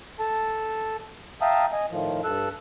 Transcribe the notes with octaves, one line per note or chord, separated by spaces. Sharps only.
A4 A5
E5 F5 G5 A5 A#5 D#6
D#5 G#5
A2 D#3 F3
G2 A4 E6 F#6